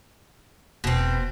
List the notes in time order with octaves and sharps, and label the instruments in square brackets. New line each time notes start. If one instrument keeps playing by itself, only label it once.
[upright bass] E1 [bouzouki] B2 C4